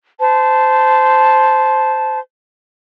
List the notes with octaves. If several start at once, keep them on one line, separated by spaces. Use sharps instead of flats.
C5 A5